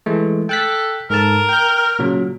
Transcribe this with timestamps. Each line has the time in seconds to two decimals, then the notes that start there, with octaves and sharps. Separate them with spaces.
0.06 E3 G#3 A3
0.49 A4 G5 F#6 B6
1.10 G#2 A4 A#4 A5
1.49 G5 G6
1.99 A#2 C#3 F#3